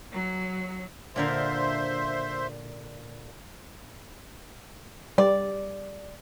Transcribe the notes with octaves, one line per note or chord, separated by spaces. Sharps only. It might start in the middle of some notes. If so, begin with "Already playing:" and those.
F#3
A#2 D3 A#4 C5 E5 C6
G3 D5